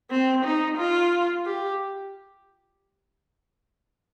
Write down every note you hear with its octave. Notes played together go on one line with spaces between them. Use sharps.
C4
D#4
F4
G4